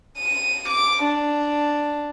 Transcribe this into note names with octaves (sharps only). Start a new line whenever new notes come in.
D#7
D6
D4